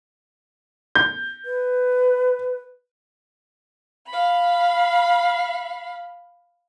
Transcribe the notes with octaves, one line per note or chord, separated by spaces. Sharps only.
G6
B4
F5 B5